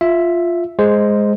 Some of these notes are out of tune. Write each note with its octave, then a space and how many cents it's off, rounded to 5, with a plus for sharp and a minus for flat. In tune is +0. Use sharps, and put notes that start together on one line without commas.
F4 +0 E5 +0
G#3 +0 G#4 +0 C5 +0